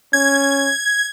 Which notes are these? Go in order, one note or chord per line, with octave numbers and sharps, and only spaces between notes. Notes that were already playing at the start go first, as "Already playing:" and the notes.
C#4 G#6